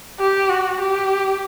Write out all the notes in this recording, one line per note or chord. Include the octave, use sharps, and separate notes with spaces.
G4
F#4
G4